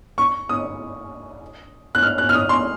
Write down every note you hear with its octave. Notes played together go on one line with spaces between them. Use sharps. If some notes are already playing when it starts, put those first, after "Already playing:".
C#6
D#6
F#6
F6
F#6
F6
D#6
C6